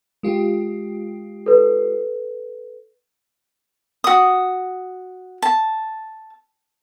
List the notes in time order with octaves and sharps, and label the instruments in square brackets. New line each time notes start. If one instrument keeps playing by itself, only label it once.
[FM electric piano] G#3 F4 G4
[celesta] A4 B4
[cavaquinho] F#4 D#6
A5